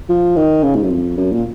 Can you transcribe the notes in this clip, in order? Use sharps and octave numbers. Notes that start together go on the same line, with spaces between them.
F3
D#3
C#3
G#2
F#2
F2
F#2
A#2